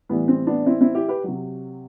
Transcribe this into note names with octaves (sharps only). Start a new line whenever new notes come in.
A2 E3 G3 B3
C4
B3 D4
C4 E4
C4 E4
E4 G4
G4 B4
C3 F#3